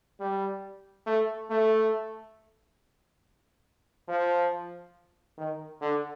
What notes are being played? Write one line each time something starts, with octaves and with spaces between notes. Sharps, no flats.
G3
A3
A3
F3
D#3
D3